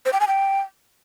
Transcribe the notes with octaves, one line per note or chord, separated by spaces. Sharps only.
C5
G5
G#5
G5